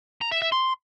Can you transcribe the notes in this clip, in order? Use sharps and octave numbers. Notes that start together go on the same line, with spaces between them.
A#5
E5
E5
C6